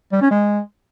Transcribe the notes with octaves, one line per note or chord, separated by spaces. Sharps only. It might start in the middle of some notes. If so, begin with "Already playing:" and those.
G3
C#4
G#3